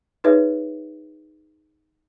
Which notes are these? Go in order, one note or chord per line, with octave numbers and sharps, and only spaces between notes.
D#4 G#4 B4 C#5 E5